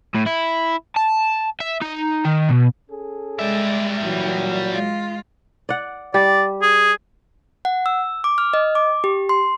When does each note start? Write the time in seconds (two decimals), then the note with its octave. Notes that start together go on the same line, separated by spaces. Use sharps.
0.15 A2
0.27 E4
0.96 A5
1.60 E5
1.81 D#4
2.25 D#3
2.49 B2
2.90 C#4 G#4 A4
3.39 G3 G#3 D5 E5
4.03 A#2 E3 F#3
4.71 G#3 F4
5.69 D5 F#5
6.14 G3 G4 D5
6.62 G#4
7.65 F#5
7.86 E6
8.24 D6
8.38 F6
8.53 D#5
8.75 D6
9.04 G4
9.29 C6